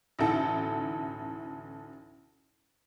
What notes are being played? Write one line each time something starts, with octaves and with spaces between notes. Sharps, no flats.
A1 D2 B2 D#4 E4 A4